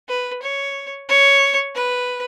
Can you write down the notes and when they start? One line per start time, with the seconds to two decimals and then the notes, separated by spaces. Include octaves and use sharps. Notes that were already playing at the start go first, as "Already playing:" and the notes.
0.08 B4
0.42 C#5
1.09 C#5
1.75 B4